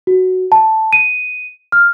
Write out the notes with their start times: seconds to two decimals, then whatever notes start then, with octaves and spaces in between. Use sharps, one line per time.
0.07 F#4
0.52 A5
0.93 D#7
1.72 F6